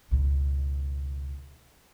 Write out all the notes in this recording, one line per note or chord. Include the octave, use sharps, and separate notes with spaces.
C#2 B2